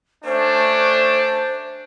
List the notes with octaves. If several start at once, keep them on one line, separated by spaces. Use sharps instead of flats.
A3 C#4 D4 C5